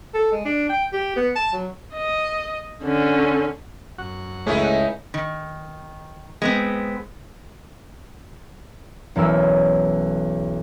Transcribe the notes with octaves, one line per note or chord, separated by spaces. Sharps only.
A4
G#3
D4
G5
G4
B3
A5
F#3
D#5
D3 C#4
F#2 F#4 F#5
C#2 A3 C#4 D#4 E4 G#4
D#3
G#3 B3 C4
B1 E2 C#4 A#4 E6 E7